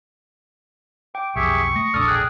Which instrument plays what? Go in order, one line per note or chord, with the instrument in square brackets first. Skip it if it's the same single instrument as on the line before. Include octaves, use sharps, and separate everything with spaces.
[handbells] G5 [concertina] D6
[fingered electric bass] B1 F2 [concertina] G4 G#4 E5 [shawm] C#6
[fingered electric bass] A3 [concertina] D#6 [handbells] A#6
[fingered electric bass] E1 A#1 D4 [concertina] A4 D5 [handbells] D#6 F6
[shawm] G#4 [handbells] G5 F#6